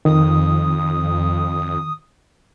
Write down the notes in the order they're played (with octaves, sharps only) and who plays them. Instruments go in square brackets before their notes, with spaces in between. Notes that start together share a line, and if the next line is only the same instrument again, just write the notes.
[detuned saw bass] F2 [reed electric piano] D#3 [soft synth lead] D#6